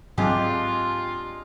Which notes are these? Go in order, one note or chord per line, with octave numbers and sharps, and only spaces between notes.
G#2 F#3 G#3 C4 D4 F4 G4